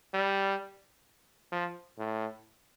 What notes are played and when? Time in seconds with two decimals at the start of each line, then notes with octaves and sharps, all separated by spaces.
0.14 G3
1.52 F3
1.98 A2